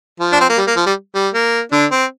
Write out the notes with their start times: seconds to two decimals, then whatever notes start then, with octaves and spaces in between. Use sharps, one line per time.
0.20 F3
0.32 D4
0.41 C4
0.49 A#3
0.58 G3
0.67 A#3
0.77 F3
0.86 G3
1.15 G3
1.34 A#3
1.72 D3 D4
1.91 C4